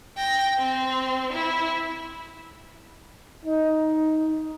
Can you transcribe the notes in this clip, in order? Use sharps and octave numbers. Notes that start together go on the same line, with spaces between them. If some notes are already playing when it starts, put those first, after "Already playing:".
G5 A#6
C4
E4
D#4